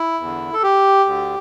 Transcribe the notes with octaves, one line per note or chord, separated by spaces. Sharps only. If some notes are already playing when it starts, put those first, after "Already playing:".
Already playing: E4
E2 D3
A4
G4
D2 D3